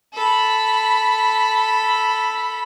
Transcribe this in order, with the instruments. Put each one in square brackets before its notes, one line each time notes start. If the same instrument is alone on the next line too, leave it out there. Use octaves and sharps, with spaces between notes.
[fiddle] A4 B5